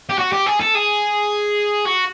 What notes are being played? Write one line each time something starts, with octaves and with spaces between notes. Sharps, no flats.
G4
F#4
G4
G#4
A4
G#4
F#4